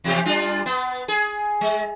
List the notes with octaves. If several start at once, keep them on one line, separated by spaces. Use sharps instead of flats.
E2 C3 G4
G3 D4 F4
B3
G#4
G#3